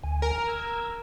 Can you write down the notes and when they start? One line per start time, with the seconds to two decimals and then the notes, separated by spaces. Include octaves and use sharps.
0.03 D2 G#5
0.22 A#4
0.47 E6 G#6